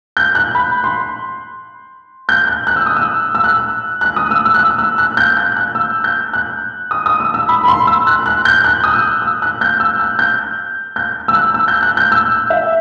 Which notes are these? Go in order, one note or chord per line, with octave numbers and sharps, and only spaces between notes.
G6
F#6
B5
C6
G6
F#6
F#6
E6
D#6
E6
E6
F#6
F#6
D#6
E6
E6
F#6
E6
E6
F#6
G6
G6
F#6
E6
G6
F#6
D#6
D#6
E6
E6
B5
B5
C6
E6
F#6
F#6
G6
F#6
D#6
E6
E6
F#6
G6
E6
F#6
G6
G6
E6
F#6
E6
G6
F#6
G6
E6
E5